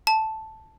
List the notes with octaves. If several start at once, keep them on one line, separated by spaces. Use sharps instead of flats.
A5